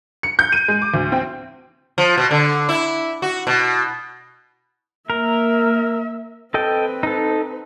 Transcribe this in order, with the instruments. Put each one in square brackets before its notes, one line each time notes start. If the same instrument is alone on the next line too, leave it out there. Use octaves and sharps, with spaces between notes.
[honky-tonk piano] C#7
G6
D#7
G#3
D6
D2
C4
[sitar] F3
B2
D3
E4
F#4
B2
[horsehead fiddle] A#3 E5 [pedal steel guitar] A#4
[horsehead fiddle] C4 B4 [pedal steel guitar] A4 D#5 G5
[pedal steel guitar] D#4 A4